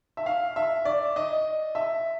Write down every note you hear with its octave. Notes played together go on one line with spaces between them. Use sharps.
E5
F5
E5
D5
D#5
E5